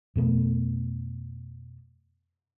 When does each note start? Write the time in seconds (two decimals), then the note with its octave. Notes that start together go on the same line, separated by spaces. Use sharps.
0.15 F2 B2 A3 B3